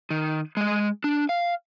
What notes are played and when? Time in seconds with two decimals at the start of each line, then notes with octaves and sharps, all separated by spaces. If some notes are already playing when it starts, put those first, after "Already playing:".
0.10 D#3
0.57 G#3 D#5
1.04 D4
1.29 F5